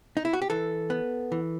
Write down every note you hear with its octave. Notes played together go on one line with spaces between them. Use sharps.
D#4
E4
F#4
G4
E3 A4
B3
E3